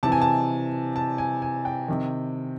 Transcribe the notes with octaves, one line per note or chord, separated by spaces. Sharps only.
C3 E3 A5
G#5
A5
A5
G#5
G#5
G5
C3 D#3